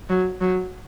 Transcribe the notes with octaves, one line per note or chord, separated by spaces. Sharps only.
F#3
F#3